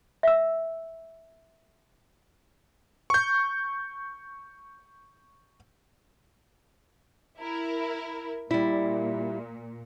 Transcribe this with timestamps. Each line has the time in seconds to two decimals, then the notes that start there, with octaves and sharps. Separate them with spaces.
0.23 E5 E6
3.10 C#6 G6
7.39 E4 A#4
8.51 A#2 G3 E4